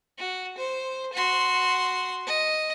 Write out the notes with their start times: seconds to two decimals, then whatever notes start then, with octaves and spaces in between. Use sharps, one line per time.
0.18 F#4
0.58 C5
1.13 F#4 C6
2.26 D#5